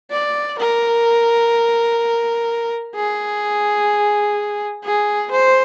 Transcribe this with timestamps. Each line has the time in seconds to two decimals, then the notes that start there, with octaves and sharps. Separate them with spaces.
0.11 D5
0.58 A#4
2.95 G#4
4.84 G#4
5.31 C5